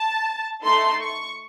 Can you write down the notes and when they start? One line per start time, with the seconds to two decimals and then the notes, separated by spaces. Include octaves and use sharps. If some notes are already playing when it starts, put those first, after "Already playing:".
Already playing: A5
0.63 A3 D#4 A4 C6
1.01 C#6